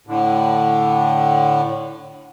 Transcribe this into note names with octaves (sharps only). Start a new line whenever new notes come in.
A2 D3